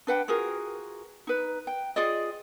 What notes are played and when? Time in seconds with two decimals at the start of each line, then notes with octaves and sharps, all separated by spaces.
0.07 D4 B4 F#5 G5
0.28 F4 F#4 G#4 A#4
1.27 D#4 B4
1.67 G5
1.96 F4 G#4 D5 D#5